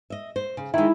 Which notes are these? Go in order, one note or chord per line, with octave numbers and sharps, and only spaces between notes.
D#5 E5
C5
C#3
D#3 G#3 E4